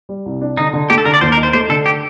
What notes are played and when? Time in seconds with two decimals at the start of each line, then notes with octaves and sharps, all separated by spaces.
0.09 G3
0.26 C2
0.41 D4
0.57 D3 D#4
0.73 D3
0.90 A3 G4
0.98 A4
1.05 D3 A#4
1.14 D5
1.21 D#2 C5
1.32 A#4
1.37 D#4
1.43 C5
1.53 A3 C5
1.69 D3 A4
1.86 G4